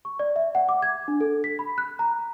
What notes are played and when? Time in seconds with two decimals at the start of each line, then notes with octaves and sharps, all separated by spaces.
0.05 C#6
0.19 D5
0.36 E5
0.55 F#5
0.69 D6
0.82 G#6
1.08 D4
1.21 A4
1.44 B6
1.59 B5
1.78 F#6
1.99 A#5